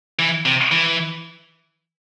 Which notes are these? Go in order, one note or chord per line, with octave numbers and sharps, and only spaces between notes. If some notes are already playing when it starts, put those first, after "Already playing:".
E3
C3
E3